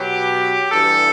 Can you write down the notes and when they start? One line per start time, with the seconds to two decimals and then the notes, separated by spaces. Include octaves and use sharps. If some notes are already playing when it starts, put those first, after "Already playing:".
Already playing: B2 F#3 G4
0.72 G2 E3 G3 A4